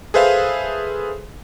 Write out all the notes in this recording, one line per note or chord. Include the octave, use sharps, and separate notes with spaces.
G#4 A4 B4 C5 E5 F5